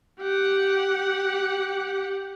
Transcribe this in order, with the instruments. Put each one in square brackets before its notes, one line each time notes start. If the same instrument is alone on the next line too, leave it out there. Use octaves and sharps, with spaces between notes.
[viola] G4 F#5